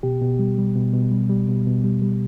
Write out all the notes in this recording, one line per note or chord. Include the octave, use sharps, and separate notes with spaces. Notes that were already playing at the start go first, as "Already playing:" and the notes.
B2 G4
B2
G3
G3
B2
B2
G3
G3
B2
B2
G3
G3